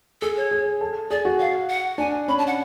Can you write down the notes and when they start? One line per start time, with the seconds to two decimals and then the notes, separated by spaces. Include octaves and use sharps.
0.21 G#4 A4
0.37 C#5
0.51 G#4
0.81 A4
1.11 G#4 D5
1.25 F#4
1.40 F5
1.69 F#5
1.98 D4 G#5
2.28 C#4 B5
2.38 A5
2.47 F#5